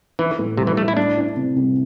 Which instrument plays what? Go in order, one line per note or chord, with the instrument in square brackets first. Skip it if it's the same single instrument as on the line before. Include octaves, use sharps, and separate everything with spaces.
[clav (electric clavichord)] E3 [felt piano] E4
[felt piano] A2
[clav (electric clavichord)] C3 [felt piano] G3
[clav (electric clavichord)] E3
[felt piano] A2 [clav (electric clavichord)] A3
[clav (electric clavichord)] E4
[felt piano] A3 [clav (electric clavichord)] D4
[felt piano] E4
C3
C2